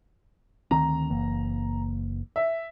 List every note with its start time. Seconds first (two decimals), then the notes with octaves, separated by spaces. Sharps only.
0.71 D2 D#3 C4 A#5
1.10 F#1 E3 A#3
2.36 E5